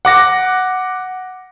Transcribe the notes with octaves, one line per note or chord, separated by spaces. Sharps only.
F#5 D6 A#6